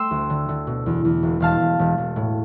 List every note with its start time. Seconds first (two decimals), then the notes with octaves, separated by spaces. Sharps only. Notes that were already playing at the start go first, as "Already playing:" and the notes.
Already playing: A3 G5 C6 E6
0.11 D2
0.30 D3
0.49 D3
0.67 B2
0.86 E2
1.05 E2
1.23 E1
1.40 E1 F5 A5
1.60 E1
1.79 E1
1.98 E1
2.16 A2